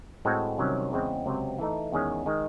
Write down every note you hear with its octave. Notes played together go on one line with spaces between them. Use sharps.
A2 G#3 C4 F#4 A4
C2 C3 D#3 F#3 C#4
E2 C#3 G#3 C4
C#2 C3 F#3 C4
E3 A3 D#4
E2 D#3 G#3 C#4 G#4
D#3 G#3